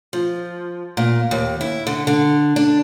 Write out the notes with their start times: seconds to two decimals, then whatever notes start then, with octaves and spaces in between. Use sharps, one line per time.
0.13 F3
0.97 A#2
1.31 D#2
1.61 E4
1.87 D3
2.07 D3
2.56 D4